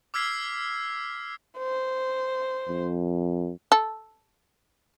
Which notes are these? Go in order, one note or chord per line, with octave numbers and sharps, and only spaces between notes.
D6 E6 F6 G#6 B6 C7
C5
F2
A4